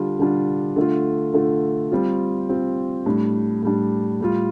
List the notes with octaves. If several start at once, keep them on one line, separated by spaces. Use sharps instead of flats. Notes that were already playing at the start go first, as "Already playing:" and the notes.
Already playing: D3 G3 D4 F4
D3 G3 D4 F4
D3 A3 F4
D3 A3 F4
G3 C4 F4
G3 C4 F4
A2 G3 D4
A2 G3 D4
A2 G3 F4